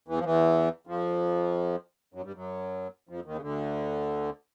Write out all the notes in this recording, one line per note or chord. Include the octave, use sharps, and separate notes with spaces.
E2 E3
F3
E2 E3
F2 F3
F#2 F#3
G2 G3
F#2 F#3
F2 F3
D#2 D#3
C#3
D2 D3